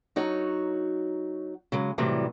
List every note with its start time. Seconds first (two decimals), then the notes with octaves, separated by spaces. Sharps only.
0.16 F#3 D#4 F#4 C#5
1.72 C#3 F#3 G#3
1.98 A2 C3 E3 F#3 G3